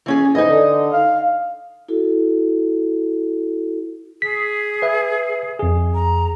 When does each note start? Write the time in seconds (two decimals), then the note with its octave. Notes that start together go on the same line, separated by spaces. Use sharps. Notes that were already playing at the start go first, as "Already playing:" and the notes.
0.06 E3 C#4 G#4
0.35 F2 G#2 E3 D#4 D#5
0.49 D3
0.92 F5
1.88 E4 F#4 A4
4.22 G#4 B6
4.82 B4 E5
5.59 F2 G#4
5.95 A#5